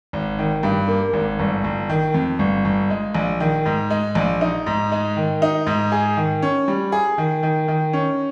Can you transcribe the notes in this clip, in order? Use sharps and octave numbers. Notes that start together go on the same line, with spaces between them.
G#1
D#3
G2
A#3
G#1
G1
G1
D#3
F2
G1
G1
G#3
A#1
D#3
G#2
G#3
A#1
D#4
G#2
G#3
D#3
D#4
G#2
G#4
D#3
C#4
G3
G#4
D#3
D#3
D#3
C#4